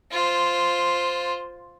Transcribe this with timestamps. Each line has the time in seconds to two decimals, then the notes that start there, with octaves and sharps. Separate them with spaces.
0.12 F4 C5